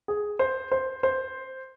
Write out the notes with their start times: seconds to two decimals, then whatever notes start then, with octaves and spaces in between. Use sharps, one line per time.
0.08 G#4
0.39 C5
0.72 C5
1.03 C5